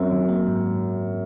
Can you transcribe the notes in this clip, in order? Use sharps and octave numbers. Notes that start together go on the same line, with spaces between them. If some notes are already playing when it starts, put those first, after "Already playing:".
Already playing: F#2 C4
D#3
A#3
G#2